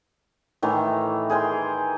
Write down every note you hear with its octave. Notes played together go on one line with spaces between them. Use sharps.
A2 D#3 E3 A3
G#4 A#4 G5 C6